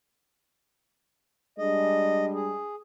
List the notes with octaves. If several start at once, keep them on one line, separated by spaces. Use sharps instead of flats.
G3 G#3 D4 D#5
G#4